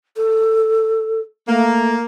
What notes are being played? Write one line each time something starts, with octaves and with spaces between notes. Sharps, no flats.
A4
A3 A#3